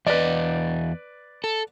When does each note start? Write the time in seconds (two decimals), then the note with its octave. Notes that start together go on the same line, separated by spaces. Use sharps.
0.07 E2 B4 D5 D#5
1.44 A4